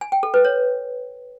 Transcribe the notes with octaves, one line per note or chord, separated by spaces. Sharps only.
G#5
G5
A4
B4
C#5